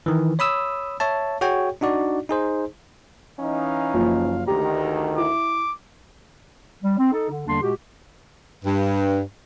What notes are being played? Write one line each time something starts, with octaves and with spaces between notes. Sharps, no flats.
D#3 E3
C#5 B5 D#6 E6
C#5 E5 A5
F#4 G#4 C#5 G5
D4 D#4 F#4 D5
D#4 G#4 C5
E3 C#4 D#4 F5
F#1 F3
D2 D#3 G4 A#5
E4 D6
G3
C4
D#4 A4
D3
E2 D3 G3 A#3 D4 C6
A#2 G#3 F#4 G4
G2